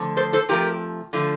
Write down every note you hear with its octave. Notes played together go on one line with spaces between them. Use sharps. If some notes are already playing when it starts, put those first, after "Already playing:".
Already playing: D3 F3 A3
A4 C5
A4 C5
C3 F3 A3 G4 A#4
D3 F3 A3